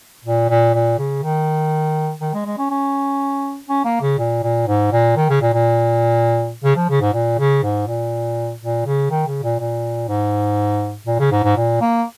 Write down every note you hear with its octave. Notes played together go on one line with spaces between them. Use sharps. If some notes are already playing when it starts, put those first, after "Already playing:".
A#2
A#2
A#2
C#3
D#3
D#3
G#3
G#3
C#4
C#4
C#4
A#3
C#3
A#2
A#2
G#2
A#2
D#3
C#3
A#2
A#2
C#3
F3
C#3
G#2
A#2
C#3
G#2
A#2
A#2
C#3
D#3
C#3
A#2
A#2
G#2
A#2
C#3
G#2
G#2
A#2
A#3